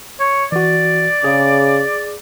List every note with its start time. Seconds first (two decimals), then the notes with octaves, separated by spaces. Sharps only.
0.20 C#5
0.52 E3 F#4 D5
1.24 C#3 G#4